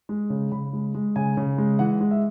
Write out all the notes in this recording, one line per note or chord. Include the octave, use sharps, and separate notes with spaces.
G#3
C#3
C#3 B5
G#3
G#3
C#3 G#5
C#3
G#3
E3 F#5
G#3
E5